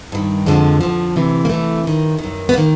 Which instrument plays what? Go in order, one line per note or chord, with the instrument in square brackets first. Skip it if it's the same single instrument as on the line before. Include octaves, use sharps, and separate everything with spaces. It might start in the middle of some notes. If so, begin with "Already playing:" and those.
[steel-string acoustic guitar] G2 D#3
F2 D3 F3 G#3
F2 D3 F3
D2 C3 E3
A#3
D2 C3 E3 A3
F#2 D#3
D#3
F#2
B3
D#3 A#3